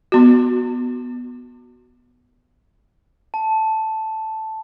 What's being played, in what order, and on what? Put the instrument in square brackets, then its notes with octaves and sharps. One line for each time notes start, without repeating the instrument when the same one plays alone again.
[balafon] B3 F#4
[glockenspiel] A5